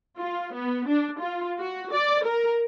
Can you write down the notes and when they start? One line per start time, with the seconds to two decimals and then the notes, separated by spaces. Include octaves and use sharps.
0.18 F4
0.54 B3
0.88 D4
1.20 F4
1.59 F#4
1.93 D5
2.25 A#4